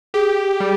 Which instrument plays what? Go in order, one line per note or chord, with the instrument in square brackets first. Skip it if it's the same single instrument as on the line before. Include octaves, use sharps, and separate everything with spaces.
[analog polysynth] G4 [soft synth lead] G#4
[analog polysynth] G3